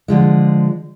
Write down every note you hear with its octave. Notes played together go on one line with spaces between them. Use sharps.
D3 F3 G#3